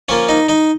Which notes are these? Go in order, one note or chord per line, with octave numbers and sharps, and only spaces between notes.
F3 A#3 C#4 F4 C#5
D#4 D#5
D#4 D#5